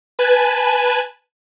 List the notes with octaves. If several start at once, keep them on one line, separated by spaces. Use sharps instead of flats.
B4 G#5 A5 F#6 G#6 D#7